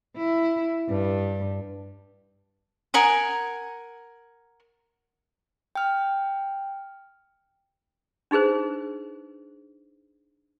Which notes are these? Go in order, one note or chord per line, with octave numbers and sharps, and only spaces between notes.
E4
G2
A#4 F#5 G#5 D#6
G5 F6
D4 D#4 G#4 B4 C5